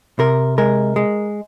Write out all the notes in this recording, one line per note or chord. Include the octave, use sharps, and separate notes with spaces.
C3 A#4
G#3 A#4
G#3